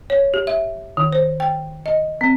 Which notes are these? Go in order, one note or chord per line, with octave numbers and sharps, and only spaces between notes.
C#5
G4
E5
D#3
C5
G5
D#5
C4